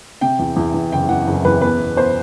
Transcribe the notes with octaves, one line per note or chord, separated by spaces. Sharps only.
C3 G5
E2
E2
E2
F#1 G5
E3 F#5
F#1
E2 B4
B3 B4
B2
B3 C5